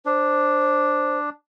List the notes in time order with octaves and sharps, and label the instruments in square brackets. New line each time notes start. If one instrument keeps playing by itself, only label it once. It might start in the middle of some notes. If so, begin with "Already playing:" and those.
[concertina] D4 [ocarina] C5